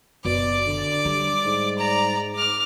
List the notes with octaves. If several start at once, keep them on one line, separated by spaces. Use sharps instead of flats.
F#1 B2 D5 D6
D3
G3
G#2
D5 A#5
D6 F6